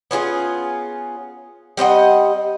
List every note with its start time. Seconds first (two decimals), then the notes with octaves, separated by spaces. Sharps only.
0.11 B3 C#4 F4 G#4
1.77 G3 C4 D#5 F#5